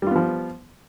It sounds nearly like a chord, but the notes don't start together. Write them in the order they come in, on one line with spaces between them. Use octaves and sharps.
G3 F4 B3 F3